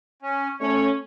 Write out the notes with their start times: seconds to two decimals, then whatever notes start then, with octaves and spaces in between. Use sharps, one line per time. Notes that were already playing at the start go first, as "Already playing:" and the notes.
0.22 C#4
0.60 A3 C#4 C#5